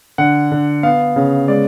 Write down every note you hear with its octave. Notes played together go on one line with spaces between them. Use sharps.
D3 F#5
D3
B3 F5
C#3
G#3 D5